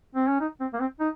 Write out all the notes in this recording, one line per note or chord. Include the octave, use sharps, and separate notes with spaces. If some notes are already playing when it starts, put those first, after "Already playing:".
C4
C#4
D#4
C4
A#3
C4
D#4